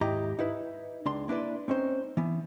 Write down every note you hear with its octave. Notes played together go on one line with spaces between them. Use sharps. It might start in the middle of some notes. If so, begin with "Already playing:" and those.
D#2 G#2 E4 G4 D#5 A#5
D#4 E4 B4
C#2 D4 C6
A#3 D4 E4 B4 D5
C4 C#4 D#4 C5
E3 B3